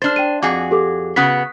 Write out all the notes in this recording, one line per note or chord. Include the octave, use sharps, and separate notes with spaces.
D4 C5 F6 A6
G5 D#7
F2 F#4 G#4 G#5 D6
G4 A4 D6
C#3 B3 F#4 D#6 F#6 B6